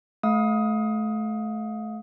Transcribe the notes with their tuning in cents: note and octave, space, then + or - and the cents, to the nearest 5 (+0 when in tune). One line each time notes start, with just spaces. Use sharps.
A3 -30 F5 +30 D#6 +15